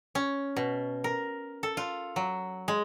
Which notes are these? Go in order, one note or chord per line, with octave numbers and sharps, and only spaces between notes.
C#4
B2
A#4
A4
F4
F#3
G#3